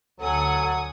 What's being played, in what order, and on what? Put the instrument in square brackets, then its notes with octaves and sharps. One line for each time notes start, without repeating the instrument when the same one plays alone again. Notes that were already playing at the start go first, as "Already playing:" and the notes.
[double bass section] D2 [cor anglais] F#3 [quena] A4 [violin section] F#5 G#5 D#6